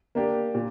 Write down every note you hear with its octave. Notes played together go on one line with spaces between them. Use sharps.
A#3 D4 G4
A#2